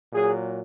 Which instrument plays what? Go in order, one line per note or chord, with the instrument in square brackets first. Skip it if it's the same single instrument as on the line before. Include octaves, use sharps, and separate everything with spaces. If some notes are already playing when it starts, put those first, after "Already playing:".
[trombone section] A#2 F#3 G#4